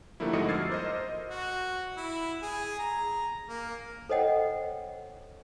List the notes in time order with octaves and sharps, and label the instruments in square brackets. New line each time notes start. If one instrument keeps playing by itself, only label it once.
[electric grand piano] D3 F3 G3 A3 A#3 E4
F2 G#2 F#4 D#5 D#6 C#7
D6 E6 F6 G#6 A6 C7
A#4 C5 D#5
[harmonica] F#4
E4
G#4
A#5
A#3
[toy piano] A4 C5 C#5 D#5 F#5 G5